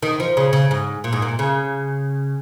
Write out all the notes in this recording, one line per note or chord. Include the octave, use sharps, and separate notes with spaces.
D#3
F3
C#3
C#3
G#2
A#2
G#2
A#2
C#3